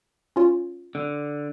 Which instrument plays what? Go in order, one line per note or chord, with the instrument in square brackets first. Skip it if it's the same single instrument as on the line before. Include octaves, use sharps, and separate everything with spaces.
[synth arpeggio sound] C#4 F4 C#5
[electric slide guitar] D3